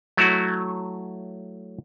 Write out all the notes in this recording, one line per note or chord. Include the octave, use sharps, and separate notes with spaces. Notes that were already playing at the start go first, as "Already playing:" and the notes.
F#3 A3 E4 F#4